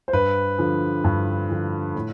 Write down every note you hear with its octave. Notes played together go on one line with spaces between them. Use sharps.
C5
G2 B4
D3 F3
G2
D3 F3
A2